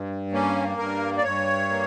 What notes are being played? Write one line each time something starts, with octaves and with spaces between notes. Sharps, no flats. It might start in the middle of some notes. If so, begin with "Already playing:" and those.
Already playing: G2
A#3 C#4
G2 A#4
D5
G2 C#5
A#3